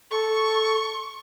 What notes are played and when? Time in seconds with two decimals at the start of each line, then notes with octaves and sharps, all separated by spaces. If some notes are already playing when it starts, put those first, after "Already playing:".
0.11 A4 C#6